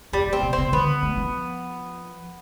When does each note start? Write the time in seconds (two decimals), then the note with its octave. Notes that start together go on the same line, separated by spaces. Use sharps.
0.13 F2 G3
0.27 A2
0.33 C4
0.43 B2
0.53 C3 C4
0.72 D3 B3
1.03 A3
1.17 F3